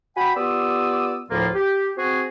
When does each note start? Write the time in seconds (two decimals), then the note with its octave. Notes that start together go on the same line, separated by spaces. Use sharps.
0.17 F#4 G5 G#5 B5
0.36 B3 F4 G4 D5 D#6 E6
1.30 D2 A2 F3 A#3 F4
1.55 G4
1.97 C4 F#4 G#4